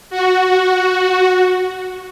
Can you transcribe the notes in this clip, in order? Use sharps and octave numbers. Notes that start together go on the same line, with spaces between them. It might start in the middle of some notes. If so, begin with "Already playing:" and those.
F#4